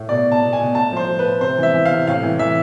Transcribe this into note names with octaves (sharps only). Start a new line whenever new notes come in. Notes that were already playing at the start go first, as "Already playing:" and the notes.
Already playing: A2
B2 D5
B2
A5
B2
G#5
B2
A2 A5
F3 C5
F3
B4
A2
C3 C5
E3 E5
E3
F5
C3
A2 F5
E3
E3 E5